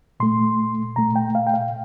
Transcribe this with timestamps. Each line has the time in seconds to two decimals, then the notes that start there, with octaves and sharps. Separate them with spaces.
0.20 A#2 A3 C6
0.96 A#2 A3 A#5
1.16 G5
1.35 F5
1.47 G5
1.54 F5